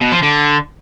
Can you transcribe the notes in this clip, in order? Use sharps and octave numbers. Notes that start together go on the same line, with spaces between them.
B2
F3
D3